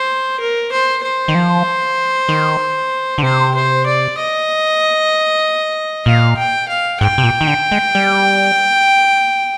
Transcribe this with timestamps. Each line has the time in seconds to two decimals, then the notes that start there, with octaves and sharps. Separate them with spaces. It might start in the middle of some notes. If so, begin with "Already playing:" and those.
Already playing: C5
0.40 A#4
0.72 C5
1.03 C5
1.28 D#3
1.35 F3
2.28 D#3
3.18 D3
3.23 C3 C5
3.55 C5
3.86 D5
4.18 D#5
6.06 A#2 F5
6.38 G5
6.69 F5
7.00 G#2 G5
7.18 C3
7.23 A#2
7.41 D#3
7.47 D3
7.71 G#3
7.95 G3